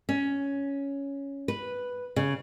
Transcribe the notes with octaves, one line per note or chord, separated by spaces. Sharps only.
C#4
B4
C#3